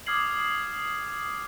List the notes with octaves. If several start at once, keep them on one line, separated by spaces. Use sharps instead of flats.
D6 D#6 F6 G#6 C7 F#7